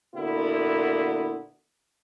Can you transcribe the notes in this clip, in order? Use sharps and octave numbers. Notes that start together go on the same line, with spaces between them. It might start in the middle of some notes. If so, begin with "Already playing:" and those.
A#2 D3 A#3 B3 E4 F#4